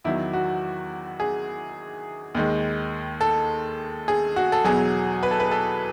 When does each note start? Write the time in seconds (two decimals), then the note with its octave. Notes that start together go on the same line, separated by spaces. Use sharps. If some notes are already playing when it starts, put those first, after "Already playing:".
0.04 E2 D#3 F#3 E4
0.33 F#4
1.20 G#4
2.35 D#2 D#3 G#3
3.21 A4
4.08 G#4
4.36 F#4
4.52 A4
4.64 E2 B2 F#3 G#4
5.23 B4
5.31 A4
5.40 B4
5.51 A4